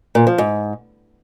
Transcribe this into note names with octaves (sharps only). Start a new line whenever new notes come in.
A#2
F3
G#2